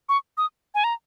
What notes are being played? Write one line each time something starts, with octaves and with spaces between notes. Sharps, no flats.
C#6
D#6
G#5
A#5